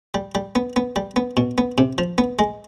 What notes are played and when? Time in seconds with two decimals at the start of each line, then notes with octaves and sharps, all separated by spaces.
0.14 G3
0.35 G3
0.55 B3
0.76 B3
0.96 G3
1.16 B3
1.37 B2
1.58 B3
1.78 C3
1.98 F3
2.18 B3
2.39 G#3